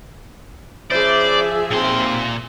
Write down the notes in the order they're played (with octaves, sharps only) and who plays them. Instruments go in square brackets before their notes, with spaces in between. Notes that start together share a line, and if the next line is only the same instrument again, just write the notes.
[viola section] F3 G#4 E5 [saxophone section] C#4 E4 C5 [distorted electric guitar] D5
[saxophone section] D#2 C4 [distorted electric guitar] A#2 C6